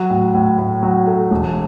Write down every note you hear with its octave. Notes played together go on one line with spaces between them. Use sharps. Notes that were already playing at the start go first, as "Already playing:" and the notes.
Already playing: F#3
A2
A2
A2
F#3
A3
E1